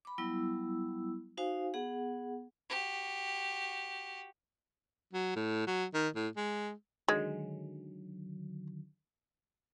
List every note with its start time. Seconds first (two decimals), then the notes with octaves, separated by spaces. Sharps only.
0.05 B5 D6
0.18 F#3 G3 B3 E4 E6
1.37 D#4 F#4 C5 F5 G#5
1.74 B3 G#4 F#5
2.69 F#4 G4
5.13 F#3
5.36 A2
5.67 F#3
5.94 D#3
6.15 A2
6.37 G#3
7.08 D3 D#3 F#3 G#3